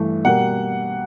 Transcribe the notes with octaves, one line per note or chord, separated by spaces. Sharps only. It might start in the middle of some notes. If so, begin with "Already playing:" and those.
Already playing: G2 E3 A3
B2 G3 A#3 F#5